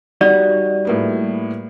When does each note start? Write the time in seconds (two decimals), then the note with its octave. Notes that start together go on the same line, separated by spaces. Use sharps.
0.21 G3 D#4 F#4 D5
0.85 A2 A#3 B3